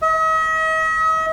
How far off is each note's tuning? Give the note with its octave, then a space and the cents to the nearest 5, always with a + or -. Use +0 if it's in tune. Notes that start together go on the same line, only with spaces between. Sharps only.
D#5 +45